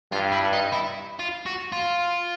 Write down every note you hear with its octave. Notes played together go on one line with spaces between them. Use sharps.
G2 F4
E4
D#4
E4
F4
F#4
F4